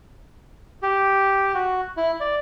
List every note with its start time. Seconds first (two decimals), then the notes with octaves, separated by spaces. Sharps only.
0.82 G4
1.55 F#4
1.97 E4
2.20 D5